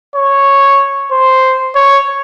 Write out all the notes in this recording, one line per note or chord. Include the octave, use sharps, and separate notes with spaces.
C#5
C5
C#5